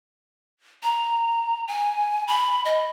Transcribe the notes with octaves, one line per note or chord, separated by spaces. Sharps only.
A#5
G#5
B5
D#5